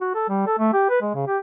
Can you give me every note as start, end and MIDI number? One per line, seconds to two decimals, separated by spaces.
0.01 0.10 66
0.15 0.24 69
0.29 0.44 55
0.47 0.59 69
0.59 0.71 57
0.74 0.86 67
0.90 1.00 71
1.02 1.12 56
1.15 1.24 49
1.27 1.38 67